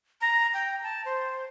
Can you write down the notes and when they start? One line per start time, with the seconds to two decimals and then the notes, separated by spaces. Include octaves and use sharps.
0.21 A#5
0.54 G5
0.83 A5
1.05 C5